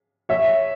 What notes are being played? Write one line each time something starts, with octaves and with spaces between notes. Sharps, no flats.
C#5 E5